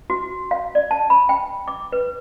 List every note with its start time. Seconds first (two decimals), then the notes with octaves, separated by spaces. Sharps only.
0.10 F#4
0.51 F5
0.75 D5
0.91 A5
1.10 B5
1.29 G5
1.68 D6
1.92 B4